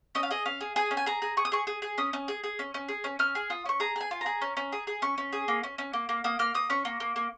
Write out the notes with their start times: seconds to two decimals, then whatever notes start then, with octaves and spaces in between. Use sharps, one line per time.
0.15 C#4 D#5
0.23 F5
0.31 G#4 D#5
0.46 C#4 F5
0.61 G#4
0.76 G#4 G#5
0.91 C#4
0.97 G#5
1.06 G#4 A#5
1.22 G#4
1.37 G#4 C#6
1.45 D#6
1.52 G#4 C#6
1.67 G#4
1.82 G#4
1.98 C#4 D#6
2.13 C#4
2.28 G#4
2.44 G#4
2.59 C#4
2.74 C#4
2.89 G#4
3.04 C#4
3.19 C#4 F6
3.35 G#4
3.50 F4 D#6
3.66 C#4 C#6
3.80 G#4 A#5
3.96 G#4 G#5
4.11 F4
4.21 G#4 A#5
4.42 C#4
4.57 C#4
4.72 G#4
4.87 G#4
5.02 C#4 C#6
5.18 C#4
5.33 G#4
5.48 A#3
5.63 C#4
5.78 C#4
5.93 A#3
6.09 A#3
6.24 A#3 D#6
6.39 A#3 F6
6.54 A#3 D#6
6.70 C#4 C#6
6.85 A#3
7.00 A#3
7.16 A#3